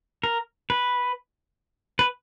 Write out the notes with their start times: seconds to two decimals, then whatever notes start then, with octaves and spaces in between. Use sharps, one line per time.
0.24 A#4
0.70 B4
1.99 B4